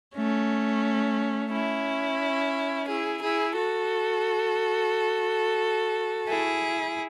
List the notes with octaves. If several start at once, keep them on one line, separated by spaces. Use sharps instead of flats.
A3 C#4
C#4 E4
E4 G#4
E4 G#4
F#4 A4
E4 G#4